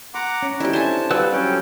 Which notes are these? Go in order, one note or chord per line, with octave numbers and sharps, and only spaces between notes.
F#5 A#5 C6 D6
C#4
G3 C4 D#4 E4 G4 A4
D4 C5 G#5 A5
G3 B4 D5 F5 F#5 E6
F#3 C#4 G4 A4 F#5 G5